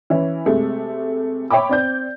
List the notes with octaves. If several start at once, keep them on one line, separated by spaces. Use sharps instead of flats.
E3 C#4 E4
C3 G#3 A3
C#5 E5 G5 B5 D6
C4 D5 G6